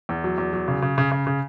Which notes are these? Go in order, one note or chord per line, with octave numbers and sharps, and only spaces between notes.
E2
F#3
E2
F#3
C#3
C#3
C#3
C#3
C#3